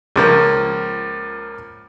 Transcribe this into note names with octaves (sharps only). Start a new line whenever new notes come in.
C#2 F3 A#3